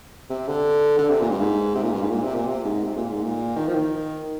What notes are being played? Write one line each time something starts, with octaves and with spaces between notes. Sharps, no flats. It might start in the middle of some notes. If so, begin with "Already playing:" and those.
C3
D3
D3
C3
A#2
G2
G#2
C3
A#2
G2
G#2
A#2
C3
A#2
C3
G#2
C3
A#2
G#2
A#2
D#3
F3
D#3